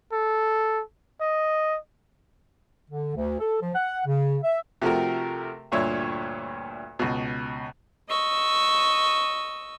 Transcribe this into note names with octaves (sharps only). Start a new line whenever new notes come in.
A4
D#5
D3
D2
A4
F3
F#5
C#3
E5
C3 F3 A3 F#4 G4 A#4
D2 G2 A#2 C#5 E5 C6
C#2 B2
D#5 C#6 E6